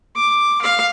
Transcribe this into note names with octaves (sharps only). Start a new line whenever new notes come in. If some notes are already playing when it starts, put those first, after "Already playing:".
D6
F5